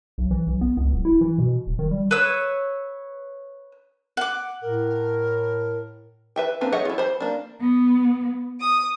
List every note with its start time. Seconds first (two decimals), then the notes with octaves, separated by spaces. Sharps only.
0.18 B1
0.31 E3
0.47 B1
0.61 B3
0.77 C#2
0.93 D1
1.05 E4
1.21 E3
1.38 B2
1.67 D#1
1.79 D#3
1.91 G3
2.11 B4 C#5 E6
4.17 F#5 D6
4.62 A2 A#4
6.36 B4 E5 G5
6.61 A#3 C4 D4 B4
6.72 G#4 C#5 D#5 E5 F#5
6.85 E4 F4
6.98 C5 B5
7.20 A#3 D4
7.60 B3
8.60 D#6